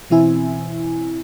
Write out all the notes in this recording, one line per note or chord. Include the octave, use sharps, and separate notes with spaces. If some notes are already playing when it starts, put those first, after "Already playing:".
B2 E3 C4 E4 G#5